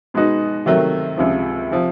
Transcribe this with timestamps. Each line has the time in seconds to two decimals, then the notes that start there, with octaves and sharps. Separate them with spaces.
0.14 B2 G#3 B3 D#4 F#4
0.66 C3 D#3 F#3 A3
1.17 C#2 C3 F3
1.71 C3 F3